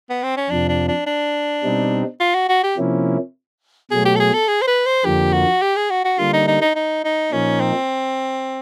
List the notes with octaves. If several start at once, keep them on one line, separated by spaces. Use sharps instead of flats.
B3
C4
C#4
F2 C3 F3 D4
D4
D4
D4
B2 G3 C4 D#4
F4
F#4
F#4
G4
C3 F3 A#3 C#4 E4
B2 F#3 A3 G#4
G4
A4
G#4
A4
G#4
C5
B4
C5
F2 D3 F3 A#3 G4
F#4
G4
G#4
F#4
F#4
D3 G3 A#3 F4
D#4
D#4
D#4
D#4
D#4
A#2 F3 A#3 C#4 D#4
C4